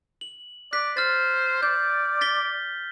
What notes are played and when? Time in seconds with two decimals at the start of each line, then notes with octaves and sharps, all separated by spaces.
0.21 F#7
0.73 D5 F#6 B6
0.97 C5 F6 A6
1.63 D5 G6
2.21 A6 B6 G7